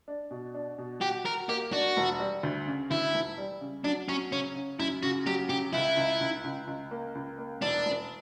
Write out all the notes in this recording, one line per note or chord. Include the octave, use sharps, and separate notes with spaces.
D4
B2
D4
B2
F#4 G4
F#4 A#4
A#3 G4
D4 F#4
E1
G3
D2
C#3
D2 E4
E1
G3
C#3
F#3 D4
F#3 C#4
C#3 C#4
C#3
F#2 E4
C#3 F#4
F#3 G4
C#3 G4
C#2 E4
C#2
C#2
C#2
C#2
A#3
C#2
A#3
E1 D4
E1